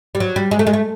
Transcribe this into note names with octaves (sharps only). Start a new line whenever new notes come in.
G3
F#3
G3
G#3
A3
G#3
A3